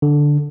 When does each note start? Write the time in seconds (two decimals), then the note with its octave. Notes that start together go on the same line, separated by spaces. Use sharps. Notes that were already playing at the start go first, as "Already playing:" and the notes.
0.02 D3